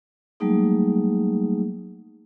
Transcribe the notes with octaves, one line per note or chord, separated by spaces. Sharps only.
F#3 G3 A3 A#3 D#4 G#4